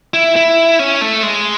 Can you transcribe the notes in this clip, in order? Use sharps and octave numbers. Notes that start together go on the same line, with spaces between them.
E4
E4
C#4
A3
G#3